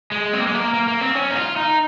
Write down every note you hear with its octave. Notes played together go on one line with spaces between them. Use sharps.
G#3
C4
A#3
G#3
A#3
A#3
A#3
C4
C#4
D#4
F4
D#4